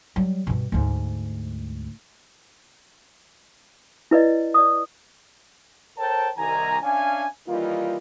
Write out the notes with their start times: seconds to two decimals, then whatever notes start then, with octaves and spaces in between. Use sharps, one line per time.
0.16 F#3 G3
0.47 G2 B2
0.72 D2 G#2
4.11 E4 B4 D5 D#5
4.54 D5 D#6
5.98 A4 A#4 C5 C#5 G5 A5
6.37 C2 D#3 G#5 A#5
6.82 C#4 D4 E5 F5 G#5
7.47 D#3 E3 G3 A#3 D#4 F4